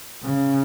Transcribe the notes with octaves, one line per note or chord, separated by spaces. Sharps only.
C#3